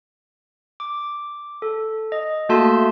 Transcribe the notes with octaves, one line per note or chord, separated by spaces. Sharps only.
D6
A4
D#5
A3 A#3 F#4 A4 A5 C6